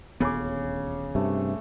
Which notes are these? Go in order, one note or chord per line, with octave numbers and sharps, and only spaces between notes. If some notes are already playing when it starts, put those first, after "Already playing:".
D#1 D2 C#3 B3 D6
G2 C3 A3